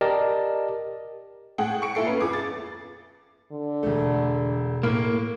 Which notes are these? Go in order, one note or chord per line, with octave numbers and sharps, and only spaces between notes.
G4 A#4 D5 D#5 A5
A2 G#4 F#5 G5
C#6 C#7 D7
A#2 E4 A4 C7
B3 C#4 B4
F2 G#4 D6
A6
D3
E1 A3
A2 A#3